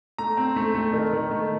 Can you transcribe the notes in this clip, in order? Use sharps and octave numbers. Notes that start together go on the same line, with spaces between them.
A3 A#5
C4
A3
A3
D#3
D#3
A3